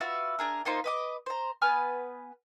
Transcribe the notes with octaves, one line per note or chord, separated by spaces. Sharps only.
F4 F#4 B4 E5
D4 G#4 A#4
A#3 D#4 F4 C5
B4 D#5 D6
C5 A#5
B3 B4 G#5 F6